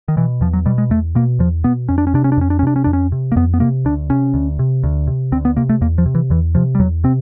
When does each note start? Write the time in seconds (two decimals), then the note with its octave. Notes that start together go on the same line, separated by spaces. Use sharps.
0.08 D#3
0.17 B2 E3
0.41 E2 F3
0.53 F#3
0.66 B2 G3
0.78 G#3
0.90 E2 A3
1.15 B2 A#3
1.39 E2 F3
1.64 B2 B3
1.89 F2 C#4
1.98 D4
2.07 C#4
2.14 C3 D4
2.24 C#4
2.32 D4
2.37 F2 C#4
2.50 D4
2.59 C#4
2.63 C3 D4
2.76 C#4
2.84 F2 D4
2.93 C#4
3.12 C3
3.32 A#3
3.36 F2 B3
3.54 B3
3.60 C3 A#3
3.85 D2 D4
4.10 C3 C#4
4.34 D2
4.59 C3
4.83 D2
5.07 C3
5.32 D2 C4
5.45 B3
5.57 C3 A#3
5.69 A3
5.81 E2 A#3
5.98 F3
6.06 C3
6.15 E3
6.30 E2 E3
6.55 C3 F3
6.75 G3
6.79 E2 F#3
7.04 C3 C4